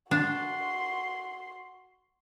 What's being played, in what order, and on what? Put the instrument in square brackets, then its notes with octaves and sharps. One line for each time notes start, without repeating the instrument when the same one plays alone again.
[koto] D4 [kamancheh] F#4 C6